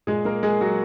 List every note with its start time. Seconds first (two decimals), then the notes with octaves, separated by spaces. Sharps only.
0.07 A#2 G#3 G#4
0.25 G#3 A#3 A#4
0.43 G#3 G#4
0.61 F#3 G#3 F#4